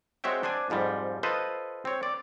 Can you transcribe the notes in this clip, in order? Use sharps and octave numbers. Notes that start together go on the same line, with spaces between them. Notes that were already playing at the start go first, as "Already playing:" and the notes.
G#3 C4 F#4 C#5 E5 G5
D4 C5 D5 G#5
F2 G#2 F3 G3
F4 A4 B4 C5 D#5
C4 C#5
D5